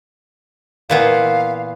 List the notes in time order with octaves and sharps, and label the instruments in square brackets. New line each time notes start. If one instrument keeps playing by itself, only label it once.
[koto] A#2 E3 B3 [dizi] F5